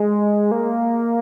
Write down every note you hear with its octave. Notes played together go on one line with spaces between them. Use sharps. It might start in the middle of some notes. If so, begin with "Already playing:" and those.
Already playing: G#3
A#3